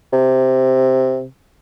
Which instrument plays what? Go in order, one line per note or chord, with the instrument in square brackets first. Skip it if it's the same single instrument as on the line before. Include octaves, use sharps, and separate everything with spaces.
[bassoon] C3